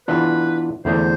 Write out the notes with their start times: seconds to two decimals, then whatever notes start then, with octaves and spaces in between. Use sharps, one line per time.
0.08 E3 B3 D4 F4 B4
0.85 E2 D3 A3 D4 C5